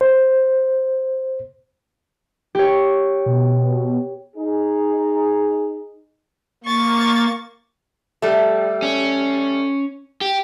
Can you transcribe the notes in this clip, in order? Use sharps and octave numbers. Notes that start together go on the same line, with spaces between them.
C5
G4 C#5
B2
D#4 G#4
A#3 C#6 A6
G3 A3
C#4
G4